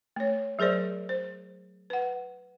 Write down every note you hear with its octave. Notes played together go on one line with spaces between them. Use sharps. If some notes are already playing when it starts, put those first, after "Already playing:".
A3 C#5
F#3 G#4 A#4 C5 D5
C5
B4 F#5